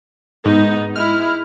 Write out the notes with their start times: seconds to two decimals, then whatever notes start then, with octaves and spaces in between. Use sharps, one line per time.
0.46 G#2 B3 D#4
0.96 G#3 E4 F6